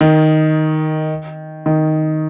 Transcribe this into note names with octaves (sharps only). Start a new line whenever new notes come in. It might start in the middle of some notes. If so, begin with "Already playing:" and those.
D#3
D#3